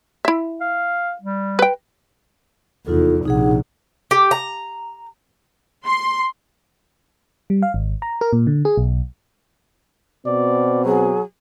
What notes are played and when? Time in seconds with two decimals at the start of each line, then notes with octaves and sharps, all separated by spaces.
0.25 E4 E5
0.60 F5
1.22 G3
1.59 B4 G5
2.87 F1 E2 D#4 F4 A4
3.25 A#1 C3 D#4 G#4 F#5
4.11 G4
4.31 A#5
5.86 C6
7.50 G3
7.62 F5
7.74 G#1
8.02 A#5
8.21 A#4
8.33 A#2
8.47 D3
8.65 G#4
8.77 B1
10.26 B2 C4 D5
10.85 F#3 G#4